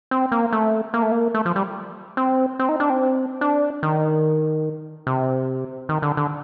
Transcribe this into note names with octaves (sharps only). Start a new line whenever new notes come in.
C4
A#3
A3
A#3
A3
A#3
A3
F3
G3
C4
C4
D#4
D4
C4
D4
D#3
C3
D#3
D3
D3